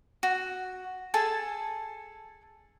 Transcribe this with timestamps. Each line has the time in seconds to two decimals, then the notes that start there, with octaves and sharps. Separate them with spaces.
0.23 F#4
1.14 G#4 A4 G#5 A5